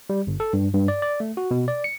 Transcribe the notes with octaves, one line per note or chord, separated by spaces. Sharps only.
G3
G1
A4
G2
G2
D5
D5
A3
F#4
B2
D5
C#7